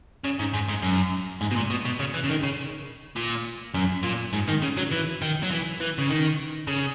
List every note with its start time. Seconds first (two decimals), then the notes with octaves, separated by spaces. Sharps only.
0.24 C#3
0.39 G#2
0.54 G#2
0.69 G#2
0.82 F#2
1.41 G#2
1.51 B2
1.56 A#2
1.70 B2
1.85 B2
1.99 C#3
2.14 E3
2.24 C#3
2.29 D#3
2.43 C#3
3.16 A#2
3.74 F#2
4.04 A#2
4.34 G#2
4.48 D#3
4.62 C#3
4.77 F#3
4.91 E3
5.22 D#3
5.43 F#3
5.51 E3
5.80 E3
5.98 C#3
6.09 D#3
6.67 C#3